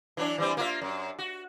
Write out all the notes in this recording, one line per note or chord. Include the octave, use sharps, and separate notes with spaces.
E3 F#3 D4
E3 G3 C4
A#3 F4 E5
F#2
F#4